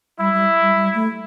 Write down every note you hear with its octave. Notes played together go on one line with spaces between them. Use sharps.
G3 E4
G3
G3
G3
A3